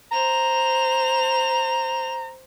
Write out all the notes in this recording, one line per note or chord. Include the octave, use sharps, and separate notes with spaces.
C5 A#5 F7